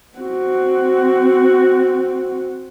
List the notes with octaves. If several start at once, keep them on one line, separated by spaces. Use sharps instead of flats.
C4 F#4